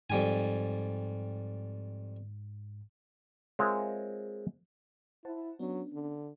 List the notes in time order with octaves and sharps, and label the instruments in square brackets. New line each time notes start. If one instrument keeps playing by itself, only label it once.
[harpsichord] F2 G3 G#5 [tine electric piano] G#2
[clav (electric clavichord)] G#3 C4 F4 A#4 C#5 E5
[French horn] E4 [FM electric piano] C5 F#5 A5
[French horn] F#3 [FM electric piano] B3 C#4 D4
[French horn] D3